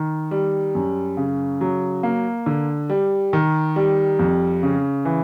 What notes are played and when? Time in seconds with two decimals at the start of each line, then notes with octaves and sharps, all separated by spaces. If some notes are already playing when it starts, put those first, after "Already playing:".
Already playing: D#3
0.31 G3
0.75 F#2
1.17 C#3
1.61 F#3
2.03 A#3
2.46 D3
2.90 G3
3.33 D#3
3.76 G3
4.19 F2
4.63 C#3
5.05 E3